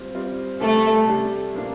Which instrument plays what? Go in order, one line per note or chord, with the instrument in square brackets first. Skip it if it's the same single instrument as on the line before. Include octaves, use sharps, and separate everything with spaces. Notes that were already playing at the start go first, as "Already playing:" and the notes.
Already playing: [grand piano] G3 C4 F4
G3 C4 F4
[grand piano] C3 G3 D4 G4 [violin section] A3 A4
[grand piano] C3 G3 D4 G4
A#2 F3 A#3 D4